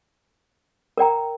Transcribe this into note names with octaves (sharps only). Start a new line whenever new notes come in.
A#4 D5 G5 A#5